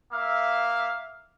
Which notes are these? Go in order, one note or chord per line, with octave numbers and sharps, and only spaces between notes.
A#3 E5 F5